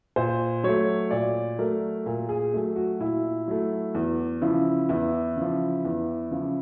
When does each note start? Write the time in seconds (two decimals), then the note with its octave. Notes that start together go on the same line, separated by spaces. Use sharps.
0.16 A#2 C5
0.64 F#3 A3 C#5
1.11 A#2 D5
1.59 F#3 A3 A#4
2.06 A#2 A#4
2.29 G#4
2.53 F#3 A3
2.76 F#4
2.99 A#2 E4
3.48 F#3 A3
3.94 E2
4.41 C#3 F3 E4
4.89 E2 E4
5.36 C#3
5.41 F3
5.84 E2
6.31 C#3 F3